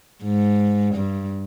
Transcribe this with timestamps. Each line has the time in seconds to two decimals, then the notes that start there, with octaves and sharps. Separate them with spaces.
0.24 G#2
0.95 G2